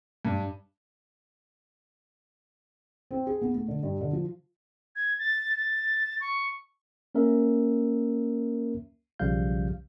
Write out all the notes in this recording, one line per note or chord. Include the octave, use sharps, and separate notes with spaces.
G2
C4
G#4
B3
A3
D3
G2
D3
F3
G#6
A6
A6
C#6
A#3 C#4 A#4 E5
B1 C#3 F3 G3 F5 G6